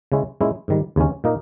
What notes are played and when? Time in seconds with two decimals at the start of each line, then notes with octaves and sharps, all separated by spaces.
0.12 C#3 G#3 C#4 E4
0.41 A#2 G#3 C#4 E4
0.68 G#2 D#3 G3
0.96 D#2 C#3 G#3 C#4
1.24 A#2 A#3 D#4 A#4